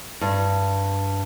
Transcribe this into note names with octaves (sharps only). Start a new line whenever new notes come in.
G2